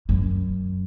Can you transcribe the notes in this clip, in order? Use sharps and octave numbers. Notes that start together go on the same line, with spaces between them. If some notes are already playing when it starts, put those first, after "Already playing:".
F#2